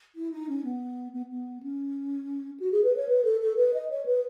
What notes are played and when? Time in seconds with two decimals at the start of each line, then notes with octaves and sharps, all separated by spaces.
0.16 E4
0.32 D#4
0.49 C#4
0.64 B3
1.14 B3
1.30 B3
1.63 C#4
2.60 F#4
2.72 G#4
2.84 B4
2.96 C#5
3.09 B4
3.25 A4
3.41 A4
3.56 B4
3.74 D#5
3.90 C#5
4.06 B4